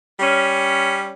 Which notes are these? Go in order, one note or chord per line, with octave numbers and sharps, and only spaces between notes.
G3 C#4